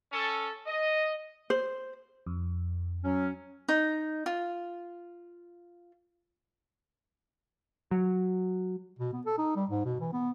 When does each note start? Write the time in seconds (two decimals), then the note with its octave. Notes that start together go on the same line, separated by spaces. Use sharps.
0.12 C#4 A4
0.67 D#5
1.50 C5
2.26 F2
3.04 F#3 C#4
3.68 D#4
4.26 F4
7.91 F#3
8.99 B2
9.13 B3
9.26 A4
9.38 D#4
9.56 G3
9.70 G#2
9.85 B2
10.01 E3
10.13 B3